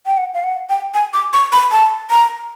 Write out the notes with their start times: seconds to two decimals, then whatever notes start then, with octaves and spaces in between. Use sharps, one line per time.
0.06 G5
0.17 F#5
0.34 F5
0.44 F#5
0.69 G5
0.94 G#5
1.13 D6
1.33 C#6
1.52 B5
1.72 A5
2.10 A#5